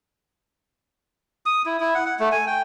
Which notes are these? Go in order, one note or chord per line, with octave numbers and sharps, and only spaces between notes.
D#6
E4
E4
F#5
F#5
A3
G#5
G5